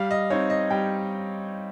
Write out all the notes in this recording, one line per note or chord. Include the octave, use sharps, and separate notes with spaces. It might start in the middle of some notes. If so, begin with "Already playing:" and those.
Already playing: G3 F5
D#5
C4 D#4 C#5
D#5
G3 G5